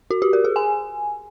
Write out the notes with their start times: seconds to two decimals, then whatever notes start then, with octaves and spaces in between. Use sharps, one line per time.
0.11 F#4
0.22 G4
0.33 A#4
0.44 G#4
0.56 G#5